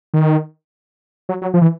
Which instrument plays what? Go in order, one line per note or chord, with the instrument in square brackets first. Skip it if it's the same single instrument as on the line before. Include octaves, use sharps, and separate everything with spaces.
[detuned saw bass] D#3
F#3
F#3
F3
E3